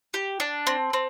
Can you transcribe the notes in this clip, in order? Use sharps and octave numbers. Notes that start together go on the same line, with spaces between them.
G4
D4
C4
C4